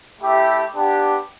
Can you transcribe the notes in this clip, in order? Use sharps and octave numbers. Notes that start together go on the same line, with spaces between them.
A3 E4 G4
B3 D4 G4